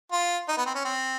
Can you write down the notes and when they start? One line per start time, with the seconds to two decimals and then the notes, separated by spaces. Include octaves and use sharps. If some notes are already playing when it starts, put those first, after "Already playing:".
0.12 F4
0.49 D#4
0.57 B3
0.66 C4
0.75 C#4
0.84 C4